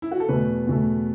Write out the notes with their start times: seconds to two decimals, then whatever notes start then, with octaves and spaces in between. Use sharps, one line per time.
0.02 E4
0.11 F#4
0.20 A4
0.28 E2 B2 A3 B4
0.67 E2 B2 A3